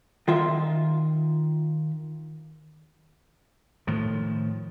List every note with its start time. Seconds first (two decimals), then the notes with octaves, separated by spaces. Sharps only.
0.28 D#3 F4 E5
3.87 A2 D#3 F3